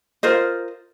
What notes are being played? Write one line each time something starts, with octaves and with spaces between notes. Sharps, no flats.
F4 A#4 C5 D#5